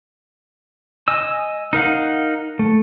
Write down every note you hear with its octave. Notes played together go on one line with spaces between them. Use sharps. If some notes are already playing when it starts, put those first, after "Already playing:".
D#5 G#5 E6
D#4 A#4 F5 F#5
A3